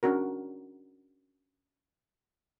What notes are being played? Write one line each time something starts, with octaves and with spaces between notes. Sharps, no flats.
C#4 D4 F#4 A#4